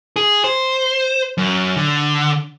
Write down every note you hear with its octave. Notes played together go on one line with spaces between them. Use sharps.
G#4
C5
F#2
D3